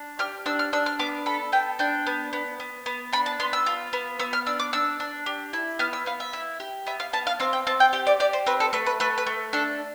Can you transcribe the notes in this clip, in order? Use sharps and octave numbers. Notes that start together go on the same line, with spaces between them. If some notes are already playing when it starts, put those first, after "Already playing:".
Already playing: D4
G4 F6
D4 E6
F6
D4 E6
F6
B3 D6
A4 B5
B3 G5
D4 G5
B3
B3
B3
B3
D4 B5
A5
B3 C6
E6
F4
B3
B3 E6
F6
D4 E6
D6
D4 E6
D4
G4
E4
B3 F6
E6
B3 F5
E5
E4
G4
B3 E5
F5
B3 A5
F5
C4 F5
G5
C4 A5
G5
G4 G5
D5
G4 D5
C5
C4 B4
A4
A3 B4
B4
A3 B4
B4
A3
D4 A4